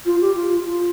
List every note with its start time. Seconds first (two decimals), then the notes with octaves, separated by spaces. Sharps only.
0.05 F4
0.21 G4
0.35 F4
0.65 F4